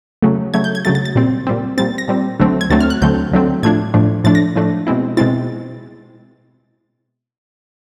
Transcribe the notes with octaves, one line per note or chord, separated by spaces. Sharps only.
C#3 F#3 A3
C#3 F#3 A3 G#6
G6
G#6
C#3 F#3 A3 A6
A6
A6
A#2 G3 C4
A#2 G3 C4
A#2 G3 C4 A6
A#6
A#2 G3 C4
D2 D3 F#3 A3 C4
G#6
D2 D3 F#3 A3 C4 A6
F6
F#6
D2 D3 F#3 A3 C4 G6
D2 D3 F#3 A3 C4
A2 F3 A3 D4 G#6
A2 F3 A3 D4
A2 F3 A3 D4 A6
A#6
A2 F3 A3 D4
B2 G#3 C4 E4
B2 G#3 C4 E4 A6